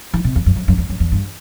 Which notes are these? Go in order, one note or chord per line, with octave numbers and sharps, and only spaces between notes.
E3
C3
E2
F#2
F#2
F#2
E2
F#2
E2
G2